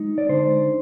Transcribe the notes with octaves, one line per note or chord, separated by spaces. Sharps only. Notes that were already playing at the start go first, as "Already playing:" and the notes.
Already playing: G#3 D#4
D5
D3 C5